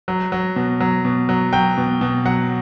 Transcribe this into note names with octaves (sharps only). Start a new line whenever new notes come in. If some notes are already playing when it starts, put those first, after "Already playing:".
F#3
F#3
B2
F#3
B2
F#3
F#3 G5
B2
B2
F#3 F#5